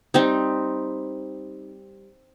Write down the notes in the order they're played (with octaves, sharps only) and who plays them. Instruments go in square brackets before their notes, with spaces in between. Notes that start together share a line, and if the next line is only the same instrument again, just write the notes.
[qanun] G3 C4 D#4